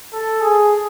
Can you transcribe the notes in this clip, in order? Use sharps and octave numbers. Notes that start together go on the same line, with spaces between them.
A4
G#4